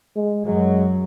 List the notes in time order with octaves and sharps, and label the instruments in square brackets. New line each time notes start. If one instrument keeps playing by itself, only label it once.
[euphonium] G#3
[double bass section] F#2 F#3 [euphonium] G#3